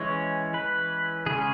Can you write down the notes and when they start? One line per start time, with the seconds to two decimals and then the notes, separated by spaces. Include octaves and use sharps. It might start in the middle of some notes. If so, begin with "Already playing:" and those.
Already playing: E3 G#3 C#4 C#5
0.54 B4
1.26 C#3 G#3 C#4 G#4